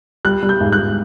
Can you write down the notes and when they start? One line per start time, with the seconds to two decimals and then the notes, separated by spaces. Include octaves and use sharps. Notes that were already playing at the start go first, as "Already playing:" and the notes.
0.25 G3 F#6
0.43 G3
0.49 G6
0.61 G#2
0.72 F#6
0.78 G#2